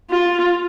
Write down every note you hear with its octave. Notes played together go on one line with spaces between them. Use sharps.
F4